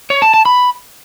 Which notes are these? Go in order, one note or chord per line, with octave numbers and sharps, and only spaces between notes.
C#5
A5
A5
B5